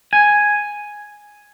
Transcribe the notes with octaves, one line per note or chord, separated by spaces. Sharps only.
G#5